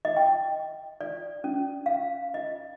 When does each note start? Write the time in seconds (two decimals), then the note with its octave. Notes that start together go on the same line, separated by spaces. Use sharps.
0.05 D#5
0.17 G5
1.01 D5
1.44 C#4
1.86 F5
2.34 D#5